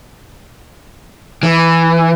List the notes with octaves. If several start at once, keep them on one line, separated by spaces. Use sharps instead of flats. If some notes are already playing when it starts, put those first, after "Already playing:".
E3